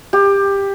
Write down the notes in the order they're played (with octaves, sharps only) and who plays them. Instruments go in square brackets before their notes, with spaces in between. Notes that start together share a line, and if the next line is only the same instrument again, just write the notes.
[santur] G4